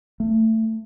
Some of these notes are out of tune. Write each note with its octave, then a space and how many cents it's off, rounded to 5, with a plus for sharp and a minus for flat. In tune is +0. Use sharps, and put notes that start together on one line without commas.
A3 +20